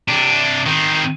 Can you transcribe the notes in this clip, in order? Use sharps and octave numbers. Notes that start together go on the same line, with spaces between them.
C3 D4
D#3 C4